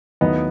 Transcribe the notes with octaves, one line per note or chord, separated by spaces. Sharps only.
D#2 D#3 F#3 A3 B3 D#4 E4